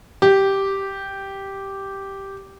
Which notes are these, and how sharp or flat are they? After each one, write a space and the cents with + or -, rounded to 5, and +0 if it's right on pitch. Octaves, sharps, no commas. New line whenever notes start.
G4 -5